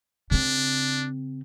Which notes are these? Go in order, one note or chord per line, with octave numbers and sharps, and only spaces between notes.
C#3 C4 D4